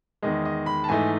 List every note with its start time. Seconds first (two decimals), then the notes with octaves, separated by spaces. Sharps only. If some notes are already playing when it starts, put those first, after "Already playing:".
0.22 E2 D#3 G#3 D#5
0.45 D#5
0.66 B5
0.84 A5
0.89 G#2 E3 A3 D#4 G#5